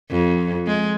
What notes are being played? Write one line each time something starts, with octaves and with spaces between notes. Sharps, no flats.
F2
G#3